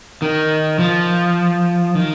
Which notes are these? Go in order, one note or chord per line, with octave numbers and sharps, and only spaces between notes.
D#3
F3
D#3